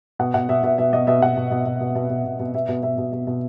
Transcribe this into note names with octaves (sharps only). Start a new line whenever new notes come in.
B2 F#5
B2 F#5
B2 E5
B2 E5
B2 E5
B2 D#5
B2 E5
B2 F#5
B2
B2
B2
B2
B2
B2
B2
B2
B2 E5
B2
B2 E5
B2
B2
B2